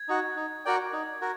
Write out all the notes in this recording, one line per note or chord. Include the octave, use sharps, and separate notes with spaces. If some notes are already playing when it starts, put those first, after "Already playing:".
Already playing: G#6
D#4 F#4
D#4
F#4 A#4 D5 G5
D#4
F#4 A#4